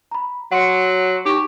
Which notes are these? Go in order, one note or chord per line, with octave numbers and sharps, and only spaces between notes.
A#5 B5
F#3 F#5 C6 C#7
D#4 G4 C#6